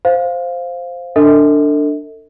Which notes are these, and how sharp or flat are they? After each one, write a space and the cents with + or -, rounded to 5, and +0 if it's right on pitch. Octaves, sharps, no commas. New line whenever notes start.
C5 +0 F5 +5
D4 +0 A4 +35 D#5 +45